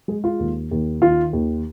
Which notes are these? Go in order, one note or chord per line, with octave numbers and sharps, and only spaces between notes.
G#3 G#4
F4
D#2
D#2
D#3 F4
D#2